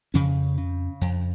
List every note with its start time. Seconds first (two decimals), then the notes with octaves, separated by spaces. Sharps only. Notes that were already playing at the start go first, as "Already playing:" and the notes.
0.14 F2 C#3 C#4
0.58 C#3
1.01 F2